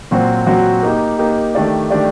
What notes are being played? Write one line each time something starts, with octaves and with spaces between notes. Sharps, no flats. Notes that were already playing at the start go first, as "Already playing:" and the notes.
A#2 F#3 C4 F#4 C5
A#2 F#3 C4 F#4 C5
A#3 D#4 G4
A#3 D#4 G4
D#3 A3 D4 G4 D5
D#3 A3 D4 G4 D5